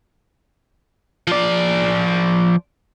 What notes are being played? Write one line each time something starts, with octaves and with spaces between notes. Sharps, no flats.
F3 D5